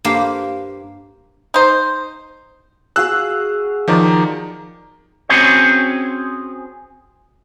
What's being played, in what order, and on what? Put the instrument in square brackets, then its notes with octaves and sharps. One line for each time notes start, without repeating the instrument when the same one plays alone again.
[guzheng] G2 A#3 G4 C5 F5
[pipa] D#4 C5
[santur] F#4 G#4 F5 [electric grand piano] E6 F#6
[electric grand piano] D#3 F3 [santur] D5 A#5
[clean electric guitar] C4 C#4 F#4 G#4 C5 C#5